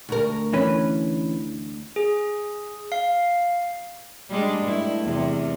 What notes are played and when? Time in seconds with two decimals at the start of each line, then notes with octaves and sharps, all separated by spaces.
0.09 D2 A#4
0.53 E3 C#4 B4
1.96 G#4
2.92 F5
4.29 G3 G#3 D4
4.63 G2 A3 E4
5.02 E2 C3